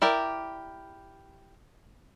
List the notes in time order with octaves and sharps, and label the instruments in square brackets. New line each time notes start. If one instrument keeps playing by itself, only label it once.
[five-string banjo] E4 G4 A#4 D5